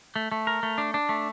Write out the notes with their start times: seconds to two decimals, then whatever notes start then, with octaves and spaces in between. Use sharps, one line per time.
0.16 A3
0.32 A3
0.47 A#4
0.63 A3
0.78 D4
0.94 D4
1.09 A3